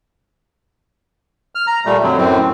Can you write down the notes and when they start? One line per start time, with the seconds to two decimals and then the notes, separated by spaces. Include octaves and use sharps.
1.55 F6
1.67 A#5
1.85 A#2 G3 A3
2.03 F2 D3 F#3
2.17 F#2 A2 C4